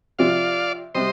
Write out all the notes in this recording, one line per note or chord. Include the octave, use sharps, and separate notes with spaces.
C3 F3 C4 D5 F5
C3 G3 C5 D#5